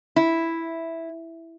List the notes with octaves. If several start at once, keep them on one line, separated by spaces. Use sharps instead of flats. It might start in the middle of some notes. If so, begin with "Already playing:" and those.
E4